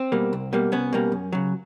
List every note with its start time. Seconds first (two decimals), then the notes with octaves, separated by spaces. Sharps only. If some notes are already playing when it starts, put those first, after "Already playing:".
Already playing: C4
0.12 B2 G3 A#3
0.33 C2
0.53 B2 G3 A#3
0.72 C2 B3 C#4
0.93 B2 G3 A#3
1.12 F#2
1.32 C#3 F#3